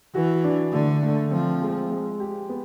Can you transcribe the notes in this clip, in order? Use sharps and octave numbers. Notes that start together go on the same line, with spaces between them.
E3 F#4
D4
D3 A3
A3
F3 C4
G#3
G#3
G4
B3